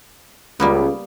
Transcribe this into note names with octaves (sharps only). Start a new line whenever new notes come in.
C#2 G3 A#3 B3